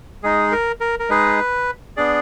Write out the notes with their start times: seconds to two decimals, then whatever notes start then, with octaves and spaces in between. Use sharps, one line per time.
0.23 G#3 D#4 G#4
0.52 A#4
0.80 A#4
0.99 A#4
1.09 G#3 D#4 G#4 B4
1.97 B3 D4 G#4 D5